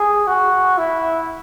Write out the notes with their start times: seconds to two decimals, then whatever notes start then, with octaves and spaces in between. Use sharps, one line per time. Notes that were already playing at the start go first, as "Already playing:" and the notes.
Already playing: G#4
0.27 F#4
0.77 E4